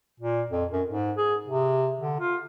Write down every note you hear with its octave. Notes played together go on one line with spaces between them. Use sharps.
A#2
F2
F#2
G#2
G#4
C3
D3
F4